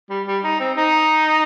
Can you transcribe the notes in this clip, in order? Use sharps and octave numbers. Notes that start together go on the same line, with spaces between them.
G3
G3
D#4
C4
D#4